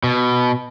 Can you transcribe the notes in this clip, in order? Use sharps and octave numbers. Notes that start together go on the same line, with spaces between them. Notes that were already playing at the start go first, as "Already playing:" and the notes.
B2